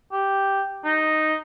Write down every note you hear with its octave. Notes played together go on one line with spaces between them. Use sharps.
G4
D#4